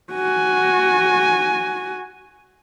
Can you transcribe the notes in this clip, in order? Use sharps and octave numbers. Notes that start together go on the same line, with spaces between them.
F#4 G#5